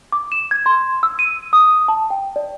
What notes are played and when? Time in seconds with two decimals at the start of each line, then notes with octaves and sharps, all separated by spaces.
0.12 D6
0.32 E7
0.51 G#6
0.66 C6
1.03 E6
1.19 D#7
1.53 D#6
1.88 A5
2.10 G5
2.36 D5